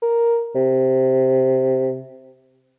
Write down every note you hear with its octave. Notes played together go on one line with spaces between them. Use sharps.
A#4
C3